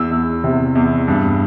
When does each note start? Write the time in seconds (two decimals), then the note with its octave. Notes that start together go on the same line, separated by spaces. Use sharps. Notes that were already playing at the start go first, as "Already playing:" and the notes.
Already playing: E2 E6
0.11 E2
0.44 C3
0.75 E2
1.08 G2